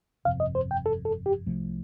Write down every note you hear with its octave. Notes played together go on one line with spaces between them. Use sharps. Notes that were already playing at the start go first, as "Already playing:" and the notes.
G1 F2 C3 F5
D#5
C5
G5
A4
A4
G4
C2 C3 F3 A3